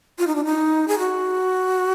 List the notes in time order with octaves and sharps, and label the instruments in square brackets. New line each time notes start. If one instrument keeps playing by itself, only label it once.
[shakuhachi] F4
D#4
D4
D#4
G#4
F#4